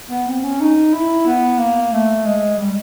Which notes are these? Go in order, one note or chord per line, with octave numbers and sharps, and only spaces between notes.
B3
C4
C#4
D#4
E4
B3
A#3
A3
G#3
G3